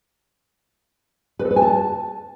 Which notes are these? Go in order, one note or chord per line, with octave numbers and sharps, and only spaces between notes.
B4
A4
B4
G#5
A5